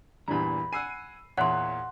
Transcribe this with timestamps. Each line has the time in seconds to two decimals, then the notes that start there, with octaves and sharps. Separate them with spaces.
0.28 E2 G2 A#2 E3 G3 A#5 B5
0.73 F#5 G#5 E6 C7 D#7
1.38 E2 A#2 C#5 E5 F#5 C6 F#6